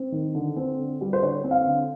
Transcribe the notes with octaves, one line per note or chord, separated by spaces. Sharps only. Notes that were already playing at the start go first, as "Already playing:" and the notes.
Already playing: C4
D#3
D3
C4
D3
G3
C5
D3 C#5
C4
F5
D3